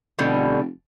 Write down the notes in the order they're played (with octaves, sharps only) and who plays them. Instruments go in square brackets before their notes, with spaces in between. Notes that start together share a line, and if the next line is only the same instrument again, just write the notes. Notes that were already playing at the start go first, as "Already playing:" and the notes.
[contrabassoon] F1 [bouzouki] B2 D3 G3